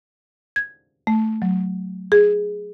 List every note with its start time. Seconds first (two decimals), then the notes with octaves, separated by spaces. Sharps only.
0.56 G#6
1.07 A3
1.42 F#3
2.12 G#4